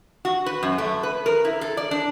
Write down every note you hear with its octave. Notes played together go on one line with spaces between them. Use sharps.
F#4
B4
F#2
A3
B4
A#4
E4
A4
D5
D4